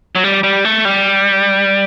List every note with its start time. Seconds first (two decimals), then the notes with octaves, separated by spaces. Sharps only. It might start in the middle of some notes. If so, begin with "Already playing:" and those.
0.16 F#3
0.24 G3
0.44 G3
0.65 A3
0.85 G3